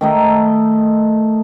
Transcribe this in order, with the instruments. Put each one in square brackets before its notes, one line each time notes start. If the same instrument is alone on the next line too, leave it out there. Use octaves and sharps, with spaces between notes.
[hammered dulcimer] D#3 A3 D#4